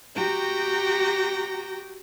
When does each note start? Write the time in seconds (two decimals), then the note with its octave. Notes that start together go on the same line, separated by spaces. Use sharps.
0.15 F#4 G4 G5 A#5